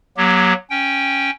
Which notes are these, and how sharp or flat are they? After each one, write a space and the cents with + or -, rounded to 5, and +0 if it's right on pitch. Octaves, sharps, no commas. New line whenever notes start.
F#3 +0 A#3 +45 G4 +0
C#4 +0 G5 +5